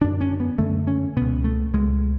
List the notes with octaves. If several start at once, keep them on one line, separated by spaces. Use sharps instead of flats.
F#2 D3 D4
C#4
B3
F#2 D3 A3
C#4
C#2 B2 B3
A3
C#2 B2 G#3